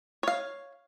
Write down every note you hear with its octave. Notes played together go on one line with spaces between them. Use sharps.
C#5 F5